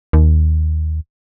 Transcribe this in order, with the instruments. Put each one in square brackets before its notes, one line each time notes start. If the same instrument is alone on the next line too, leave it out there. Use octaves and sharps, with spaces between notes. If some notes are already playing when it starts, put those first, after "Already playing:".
[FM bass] D#2